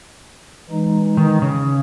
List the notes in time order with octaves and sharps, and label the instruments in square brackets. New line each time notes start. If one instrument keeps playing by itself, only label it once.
[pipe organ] E3 G#3 D#4
[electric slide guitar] D#3
C#3